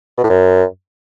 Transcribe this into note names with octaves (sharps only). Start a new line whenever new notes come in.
B2
A2
F#2